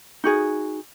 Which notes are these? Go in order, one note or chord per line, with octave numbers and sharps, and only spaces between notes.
D#4 F#4 G#4